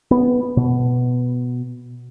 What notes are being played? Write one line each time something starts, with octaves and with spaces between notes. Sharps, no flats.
B3
B2